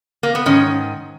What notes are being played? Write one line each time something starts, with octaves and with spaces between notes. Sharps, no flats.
A#3
B3
G#2 D#3 C#4